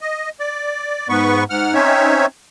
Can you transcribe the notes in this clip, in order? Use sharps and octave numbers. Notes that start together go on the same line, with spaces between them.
D#5
D5
G#2 B3 B4 C#6
G#2 F#5 F6
C4 C#4 D#4 C#5 E5